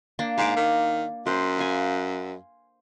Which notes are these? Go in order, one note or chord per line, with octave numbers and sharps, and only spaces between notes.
A#3 D4
G#2 F5 D6
D#3
F#2 C5
F5 G#5